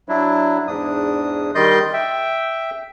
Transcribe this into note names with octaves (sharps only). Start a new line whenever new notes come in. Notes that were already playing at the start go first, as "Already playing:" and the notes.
F#3 D4 E4
E2 G#2 D4 D#6
D#3 G3 D5 D#5 C6 G6
E5 G5